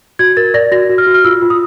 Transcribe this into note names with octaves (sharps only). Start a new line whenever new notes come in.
F#4 G#6
A#4 A6
D5 A#6
F#4 A#6
F#4
F6
F#4
F6
F4 E6
F4
D#6